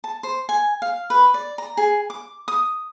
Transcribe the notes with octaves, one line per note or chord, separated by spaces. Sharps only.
A5
C5
G#5
F5
B4
D5
A#5
G#4
D6
D#6